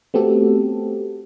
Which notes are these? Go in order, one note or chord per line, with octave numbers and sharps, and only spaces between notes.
A3 B3 C4 F#4 G4 A4